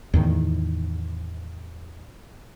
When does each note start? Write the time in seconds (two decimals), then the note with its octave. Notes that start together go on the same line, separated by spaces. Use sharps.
0.14 E2 A2 D#3